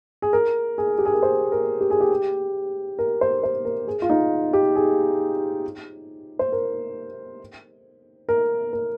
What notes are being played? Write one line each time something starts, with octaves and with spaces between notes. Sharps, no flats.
G#4
A#4
G#4
G4
G#4
A#4
C5
A#4
G4
G#4
G4
A#4
C5
C5
A#4
G#4
F4
D#4
G4
G#4
C5
A#4
A#4
A#4